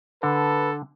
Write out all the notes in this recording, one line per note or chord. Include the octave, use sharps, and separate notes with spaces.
D3 A4 B4